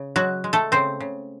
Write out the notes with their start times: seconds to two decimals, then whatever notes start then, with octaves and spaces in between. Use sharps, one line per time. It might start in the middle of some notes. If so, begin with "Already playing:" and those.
Already playing: C#3
0.16 F#3 G#3 F#4
0.44 G#3
0.53 A3 A4
0.72 C#3 C4 C5
1.00 C#3